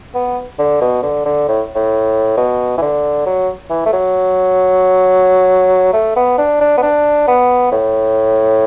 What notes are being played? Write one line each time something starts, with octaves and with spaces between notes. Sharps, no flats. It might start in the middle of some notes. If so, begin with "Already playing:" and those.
B3
D3
B2
D3
D3
A2
A2
B2
E3
D3
F#3
E3
A3
F#3
A3
B3
D4
D4
B3
D4
B3
A2